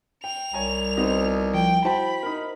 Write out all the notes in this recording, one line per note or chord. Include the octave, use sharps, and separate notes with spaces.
G5 F7
C2 C#5 G#5 A#5
B3 C4 D#4 F#4 C5
F3 G5
E4 F#4 C5 G5 A5 B5
D#4 A#4